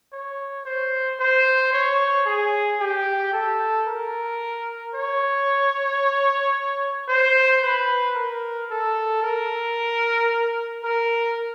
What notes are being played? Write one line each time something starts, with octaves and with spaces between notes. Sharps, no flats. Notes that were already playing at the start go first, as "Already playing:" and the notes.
C#5
C5
C5
C#5
G#4
G4
A4
A#4
C#5
C5
B4
A#4
A4
A#4
A#4